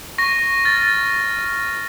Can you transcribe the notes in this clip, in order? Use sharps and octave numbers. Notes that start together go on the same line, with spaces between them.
C#6 A#6
F6 A6